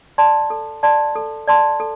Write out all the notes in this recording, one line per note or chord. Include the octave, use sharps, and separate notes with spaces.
D5 A5 C6
A4
D5 A5 C6
A4
D5 A5 C6
A4